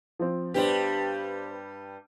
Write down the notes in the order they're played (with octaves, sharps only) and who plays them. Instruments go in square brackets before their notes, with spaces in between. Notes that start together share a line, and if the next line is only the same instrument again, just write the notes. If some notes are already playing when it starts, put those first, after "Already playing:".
[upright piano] F3 C4
[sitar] G2 G3 G4 [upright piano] B3 D4 C5